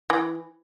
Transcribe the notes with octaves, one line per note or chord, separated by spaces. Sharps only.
E3